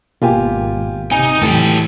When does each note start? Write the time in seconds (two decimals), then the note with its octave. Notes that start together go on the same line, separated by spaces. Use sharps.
0.22 G#1 B2 A#3 F4 G4 G#5
1.11 C3 D#4 G#5
1.41 A2 E3 F#3 G4 A4